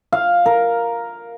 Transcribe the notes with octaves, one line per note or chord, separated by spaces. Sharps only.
F5
A#4